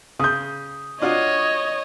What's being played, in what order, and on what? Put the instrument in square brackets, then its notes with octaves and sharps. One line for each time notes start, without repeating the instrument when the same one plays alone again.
[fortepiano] C#3 [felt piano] D#6 G6
[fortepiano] D4 F4 F#4 [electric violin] C#5 D#5